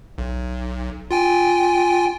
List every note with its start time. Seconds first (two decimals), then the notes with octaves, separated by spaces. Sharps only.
0.18 B1
1.11 F4 G5 G#5